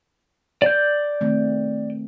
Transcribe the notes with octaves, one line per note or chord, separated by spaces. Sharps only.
D5 G6
D#3 A3 C4